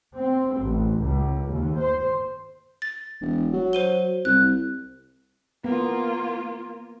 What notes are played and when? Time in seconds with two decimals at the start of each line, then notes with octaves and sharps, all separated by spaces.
0.17 C4
0.57 A1
1.00 C#2
1.50 D#2
1.79 C5
2.82 A6
3.21 E1
3.53 F#3
3.73 C5 D#7 G7
4.25 C2 F#6
5.64 A#3 B3 F4